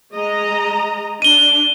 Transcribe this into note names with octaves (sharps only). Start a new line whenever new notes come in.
G#3 D#5 A#5
D4 D#7 G7